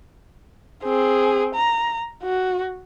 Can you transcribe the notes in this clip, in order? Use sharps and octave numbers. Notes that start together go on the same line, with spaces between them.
C4 G#4
A#5
F#4